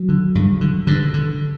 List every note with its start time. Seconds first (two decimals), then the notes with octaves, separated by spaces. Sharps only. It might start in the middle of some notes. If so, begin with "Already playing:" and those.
Already playing: F#3
0.09 D3
0.35 G2
0.61 D3
0.87 G2 D3
1.14 D3